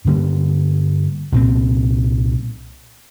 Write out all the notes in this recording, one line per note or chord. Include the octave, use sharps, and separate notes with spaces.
G2 D3 G3 A#3
C2 A#2 G3 C4